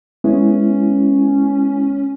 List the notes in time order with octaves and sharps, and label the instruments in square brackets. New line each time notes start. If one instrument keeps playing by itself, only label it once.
[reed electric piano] G#3 B3 E4 [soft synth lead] C#4